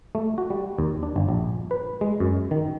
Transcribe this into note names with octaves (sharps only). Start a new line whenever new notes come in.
A3
F#4
G3
D#2
D4
G1
A#1
B4
G#3
F#2
D#3